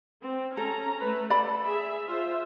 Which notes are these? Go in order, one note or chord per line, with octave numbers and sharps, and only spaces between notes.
C4
C#4 A4 A#5
A3 B4
A4 D5 B5
G#4 E5
F4 C5 E5